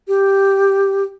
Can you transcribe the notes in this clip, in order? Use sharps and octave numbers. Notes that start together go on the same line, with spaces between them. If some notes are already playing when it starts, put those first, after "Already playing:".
G4